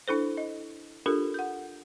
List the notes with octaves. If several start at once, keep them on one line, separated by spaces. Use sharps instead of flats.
D4 E4 A4 C5
D#5
D4 F4 G4 A4 A#4
F#5 G6